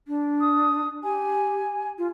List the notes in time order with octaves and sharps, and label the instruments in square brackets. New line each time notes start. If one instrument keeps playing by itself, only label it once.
[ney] D4
[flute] D#6
[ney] G4 [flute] G#5
[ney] F4